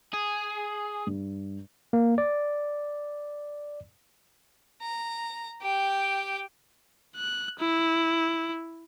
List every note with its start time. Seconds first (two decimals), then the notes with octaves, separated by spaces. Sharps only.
0.13 G#4
1.07 G2
1.93 A#3
2.18 D5
4.82 A#5
5.62 G4 G5
7.16 F#6
7.59 E4